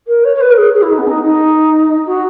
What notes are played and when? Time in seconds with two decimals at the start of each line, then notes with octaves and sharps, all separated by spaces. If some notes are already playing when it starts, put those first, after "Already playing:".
0.07 A#4
0.24 C#5
0.35 C#5
0.40 B4
0.50 A#4
0.57 G#4
0.73 G#4
0.82 E4
0.90 D#4
0.98 B3
1.07 D#4
1.23 D#4
2.06 F#4